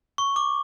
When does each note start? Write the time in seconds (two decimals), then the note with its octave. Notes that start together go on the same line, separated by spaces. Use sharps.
0.18 C#6
0.36 D6